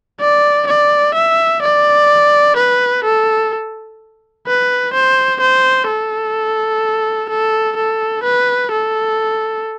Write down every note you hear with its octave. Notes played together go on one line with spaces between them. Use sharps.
D5
D5
E5
D5
B4
A4
B4
C5
C5
A4
A4
A4
B4
A4